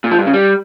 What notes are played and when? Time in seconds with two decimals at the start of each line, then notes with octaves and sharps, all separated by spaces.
0.04 A#2
0.11 F3
0.19 G2
0.26 C#3
0.33 G3